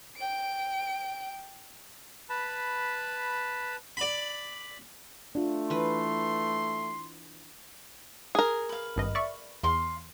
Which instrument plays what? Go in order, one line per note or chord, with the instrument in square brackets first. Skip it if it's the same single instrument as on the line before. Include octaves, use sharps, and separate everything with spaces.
[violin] G5 D7
[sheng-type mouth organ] B4 A5 B5
[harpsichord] D5 B5
[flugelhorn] A3 [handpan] D4 F4
[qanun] E3 B4 [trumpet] C6
[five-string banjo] G#4 A#4
[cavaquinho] B4 F5
[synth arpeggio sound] G#1 G2 D#5
D5 E5 C#6
[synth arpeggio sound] E2 [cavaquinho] F5 C6